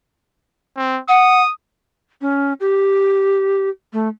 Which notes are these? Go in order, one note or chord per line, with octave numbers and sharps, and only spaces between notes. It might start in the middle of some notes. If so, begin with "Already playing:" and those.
C4
F#5 D#6
C#4
G4
A3